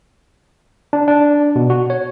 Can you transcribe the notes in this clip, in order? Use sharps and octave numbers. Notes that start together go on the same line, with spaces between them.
D4
D4
B2
F#4
C#5